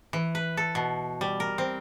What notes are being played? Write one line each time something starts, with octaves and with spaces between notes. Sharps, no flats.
E3
B4
A4
B2
G3
A#4
C4